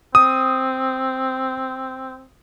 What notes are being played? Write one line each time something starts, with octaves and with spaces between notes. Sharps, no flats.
C4 D#6